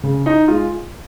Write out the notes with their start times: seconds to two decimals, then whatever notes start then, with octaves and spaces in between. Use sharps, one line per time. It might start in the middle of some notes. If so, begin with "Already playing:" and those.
0.03 C#3
0.26 D#4
0.48 G#3 F4